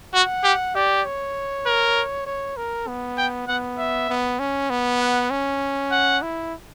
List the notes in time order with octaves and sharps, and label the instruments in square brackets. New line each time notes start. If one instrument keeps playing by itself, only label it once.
[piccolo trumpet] F#4 [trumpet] F#5
[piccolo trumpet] G4
[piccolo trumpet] G4 [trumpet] D5
[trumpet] C#5
[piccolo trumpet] A#4
[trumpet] C#5
A#4
B3
[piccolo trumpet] G5
[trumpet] B3 [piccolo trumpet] F#5
[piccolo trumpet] E5
[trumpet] B3
C#4
B3
[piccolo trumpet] F#5
[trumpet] C#4
[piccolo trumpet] F#5
[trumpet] E4